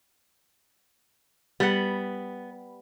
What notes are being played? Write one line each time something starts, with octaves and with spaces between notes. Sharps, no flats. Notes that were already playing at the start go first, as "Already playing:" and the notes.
G3 B3 F#5